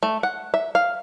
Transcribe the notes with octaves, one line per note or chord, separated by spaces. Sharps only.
A3
F#5
E5
F5